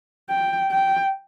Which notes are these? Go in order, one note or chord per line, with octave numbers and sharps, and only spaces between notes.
G5
G5